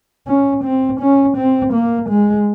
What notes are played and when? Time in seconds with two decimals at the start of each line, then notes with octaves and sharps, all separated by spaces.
0.27 C#4
0.64 C4
1.00 C#4
1.37 C4
1.73 A#3
2.09 G#3